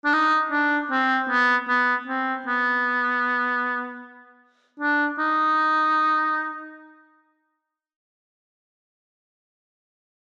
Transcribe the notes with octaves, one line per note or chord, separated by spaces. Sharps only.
D4
D#4
D4
C4
B3
B3
C4
B3
D4
D#4